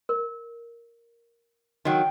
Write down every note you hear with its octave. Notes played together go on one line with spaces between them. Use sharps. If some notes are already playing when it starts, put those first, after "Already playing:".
A#4
D#3 F#3 G5